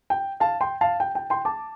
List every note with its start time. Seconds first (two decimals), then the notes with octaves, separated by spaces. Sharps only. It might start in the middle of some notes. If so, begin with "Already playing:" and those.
0.10 G5
0.40 F5 A5
0.61 G5 C6
0.81 F5 A5
1.00 G5
1.15 G5
1.30 G5 C6
1.45 A5 D6